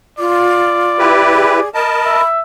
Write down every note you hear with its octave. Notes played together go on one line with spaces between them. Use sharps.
F4 D5
E4 G4 B4
G#4
A#4 D#5 A5 B5
E5